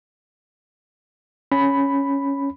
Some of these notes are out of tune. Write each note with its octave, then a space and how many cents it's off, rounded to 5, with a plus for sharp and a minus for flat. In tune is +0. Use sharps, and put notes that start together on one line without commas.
C#4 +0 B5 +0